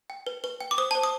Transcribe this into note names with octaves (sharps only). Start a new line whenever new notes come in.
G5
B4
B4
G5
D6
C5 D#6
C5 A5
D#6